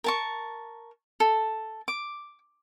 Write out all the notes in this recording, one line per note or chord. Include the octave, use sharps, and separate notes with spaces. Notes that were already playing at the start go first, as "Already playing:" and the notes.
A#4 A5 C#6
A4
D6